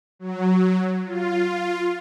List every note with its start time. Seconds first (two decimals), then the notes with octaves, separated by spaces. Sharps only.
0.19 F#3
1.06 F4